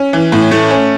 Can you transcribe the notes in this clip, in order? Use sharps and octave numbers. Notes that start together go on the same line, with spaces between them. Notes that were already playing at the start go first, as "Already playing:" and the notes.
Already playing: C#4
E3
A2
A3
C#4